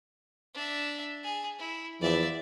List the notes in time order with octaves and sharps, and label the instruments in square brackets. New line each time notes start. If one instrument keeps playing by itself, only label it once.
[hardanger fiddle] D4 E5
G#4
E4
[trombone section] E2 E3 F3 [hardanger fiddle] D5 E5